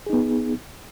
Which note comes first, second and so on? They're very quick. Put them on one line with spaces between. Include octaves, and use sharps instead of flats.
G#4 D#4 B3